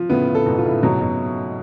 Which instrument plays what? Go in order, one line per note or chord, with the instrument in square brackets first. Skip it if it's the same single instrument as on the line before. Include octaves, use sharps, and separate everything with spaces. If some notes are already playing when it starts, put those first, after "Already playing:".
Already playing: [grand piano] F3
[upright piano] A2 C#3 [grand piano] B3
[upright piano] A2 C#3
[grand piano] A4
[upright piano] G#2 B2
[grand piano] F4
[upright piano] A2 C#3
[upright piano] G#2 B2 [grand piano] F#3
[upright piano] B2